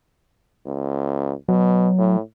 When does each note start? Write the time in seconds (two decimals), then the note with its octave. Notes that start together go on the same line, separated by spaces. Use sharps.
0.66 C#2
1.49 B2 F#3
1.98 A2